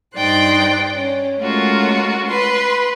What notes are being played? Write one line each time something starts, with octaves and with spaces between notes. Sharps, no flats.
G2 D#4 C5 D5 G5 F#6
C#4
G#3 A3 C#4 F4 F#4 A#4
B4 C6